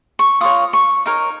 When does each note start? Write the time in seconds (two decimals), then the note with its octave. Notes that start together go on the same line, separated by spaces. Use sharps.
0.19 C#6
0.41 F4 A#4 C#5 D#6
0.73 C#6
1.06 D#4 A#4 C#5